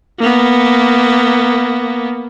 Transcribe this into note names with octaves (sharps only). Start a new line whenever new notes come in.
A#3 B3